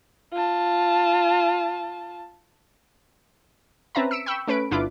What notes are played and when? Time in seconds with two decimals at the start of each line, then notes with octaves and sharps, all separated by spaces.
0.33 F4 A5
3.95 C4 C#4 B4 E5 A5 A#5
4.11 E6 B6 C#7 D7 E7
4.26 G5 B5 C#6 E6
4.47 A3 C#4 B4 D7
4.71 G1 D4 E4 F4 B4 D6